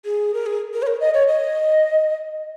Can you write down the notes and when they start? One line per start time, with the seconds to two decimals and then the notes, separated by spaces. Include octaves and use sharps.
0.05 G#4
0.34 A#4
0.46 G#4
0.74 A#4
0.82 C#5
0.87 A#4
1.01 D#5
1.14 C#5
1.28 D#5